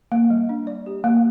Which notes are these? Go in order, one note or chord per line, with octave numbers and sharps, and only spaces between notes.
A#3
G3
D4
D5
G4
A#3